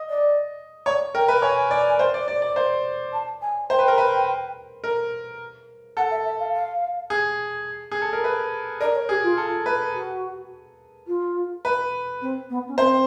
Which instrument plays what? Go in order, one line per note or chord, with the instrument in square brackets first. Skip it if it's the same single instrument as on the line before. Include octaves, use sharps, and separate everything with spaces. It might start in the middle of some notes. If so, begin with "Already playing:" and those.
Already playing: [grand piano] D#5
[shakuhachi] D5
[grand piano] C#5 [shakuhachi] D5
[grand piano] A#4 [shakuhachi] G5
[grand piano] B4
[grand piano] C#5 [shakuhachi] G#5
[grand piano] D5
C5
D5
D5
D5
C5
[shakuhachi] A5
G#5
[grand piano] C5 [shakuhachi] G5
[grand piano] B4
A#4
B4
A#4
[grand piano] A4 [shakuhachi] F#5
[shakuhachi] E5
E5
F5
F5
[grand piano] G#4
G#4
A4
A#4
B4
[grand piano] A#4 [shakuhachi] D5
[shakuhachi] C#5
[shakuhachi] G4 [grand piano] G#4
[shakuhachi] F4
[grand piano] A4
B4
[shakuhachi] F#4
F4
[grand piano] B4
[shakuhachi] C4
B3
C#4
[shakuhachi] C4 [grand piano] C5